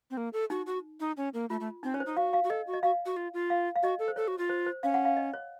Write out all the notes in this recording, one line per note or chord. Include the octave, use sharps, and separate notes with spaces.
C4
A#3
A4
D#4 F#4
F#4
D#4
C#4
A#3
A3 F4
A3
C4 D#4
C#4 C#5
C5
D#4
F#4 F5
F5
F#4
A4 D#5
F#4
D#5
F#4 F5
F#4
F4
F4
F5
F5
F#4 D#5
A4
C5
A4 C#5
F#4
F4
C5
C5
C#4 F5
F#5
F5
D#5
C#5